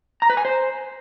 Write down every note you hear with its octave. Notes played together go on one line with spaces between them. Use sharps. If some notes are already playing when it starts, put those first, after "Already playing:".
A#5
B4
G#5
C5